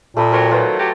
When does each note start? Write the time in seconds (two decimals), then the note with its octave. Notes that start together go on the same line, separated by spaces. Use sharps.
0.17 A#2 A3 B5 D#6
0.32 F#3 C#4 A#4 C5 G5 C6
0.51 D#3 F#3 F4 B4
0.78 F#3 G4